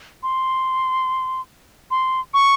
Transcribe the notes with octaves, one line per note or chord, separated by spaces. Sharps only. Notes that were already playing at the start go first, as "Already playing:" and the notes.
C6
C6
C#6